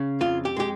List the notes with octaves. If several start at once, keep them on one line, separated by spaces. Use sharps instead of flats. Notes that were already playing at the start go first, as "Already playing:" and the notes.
Already playing: C#3
F2 F4
G4
G#3 G4